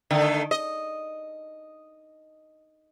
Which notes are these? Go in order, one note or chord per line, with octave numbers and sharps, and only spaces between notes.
D3 D#3 A3
D#5